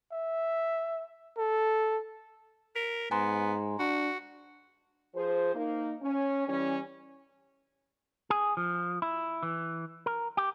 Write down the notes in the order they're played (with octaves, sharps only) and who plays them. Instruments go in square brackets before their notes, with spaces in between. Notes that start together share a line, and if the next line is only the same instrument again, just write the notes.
[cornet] E5
A4
[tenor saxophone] A#4 [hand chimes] B6
[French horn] G#2 [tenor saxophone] B3 [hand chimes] G#5 A#5 C6
[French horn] D4 [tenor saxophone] F#4
[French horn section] F3 G#4 C5
A#3 D#4
C#4
E3 G3 C#4
[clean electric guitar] G#4
F3
E4
E3
A#4
G4